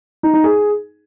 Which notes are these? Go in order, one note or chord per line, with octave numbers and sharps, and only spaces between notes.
D#4
D#4
G#4